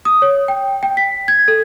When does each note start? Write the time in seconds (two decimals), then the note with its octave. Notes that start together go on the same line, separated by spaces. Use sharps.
0.05 D#6
0.22 C#5
0.48 G5
0.83 G5
0.97 B6
1.28 G#6
1.48 A4